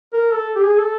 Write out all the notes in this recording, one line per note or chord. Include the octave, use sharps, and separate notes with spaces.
A#4
A4
G4
G#4
A4